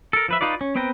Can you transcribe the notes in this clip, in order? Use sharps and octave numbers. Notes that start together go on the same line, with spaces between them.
A4 A#4
F3 B4 E5
D#4 F4 B4 D5
C#4
B3 C4 B4 G5 A#5